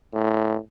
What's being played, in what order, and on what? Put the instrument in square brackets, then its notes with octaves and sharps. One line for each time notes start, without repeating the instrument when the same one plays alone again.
[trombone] A2